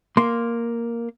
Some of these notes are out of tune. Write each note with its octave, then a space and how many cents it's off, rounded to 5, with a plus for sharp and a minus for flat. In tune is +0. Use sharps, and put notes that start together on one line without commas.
A#3 +0 C6 +0